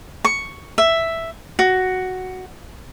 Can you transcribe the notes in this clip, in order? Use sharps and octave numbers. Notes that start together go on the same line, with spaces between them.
C#6
E5
F#4